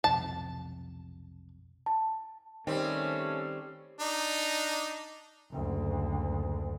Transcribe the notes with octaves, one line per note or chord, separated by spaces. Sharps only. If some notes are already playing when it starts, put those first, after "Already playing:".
B1 F2 C3 A5
A5
D#3 G3 A3 C4 C#4
D4 D#4
F#1 D2